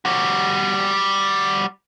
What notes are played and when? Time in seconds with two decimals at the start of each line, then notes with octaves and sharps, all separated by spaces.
0.05 G3 F#4